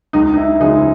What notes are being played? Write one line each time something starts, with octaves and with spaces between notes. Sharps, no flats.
C#2 D#4
D#4
E4
C#3 F3 G#3 D#4